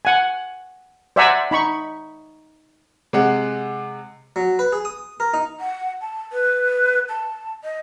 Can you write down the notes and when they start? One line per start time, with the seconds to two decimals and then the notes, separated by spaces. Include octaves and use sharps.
0.05 F#5 G#5
1.16 C5 D5 E5 F#5 G#5 A#5
1.51 D#4 B5 C#6
3.13 C3 G#3 F#5
4.36 F#3
4.59 B4
4.72 G#4
4.85 D#6
5.20 A#4
5.34 D#4
5.60 F#5
6.01 A5
6.32 B4
7.09 A5
7.64 D#5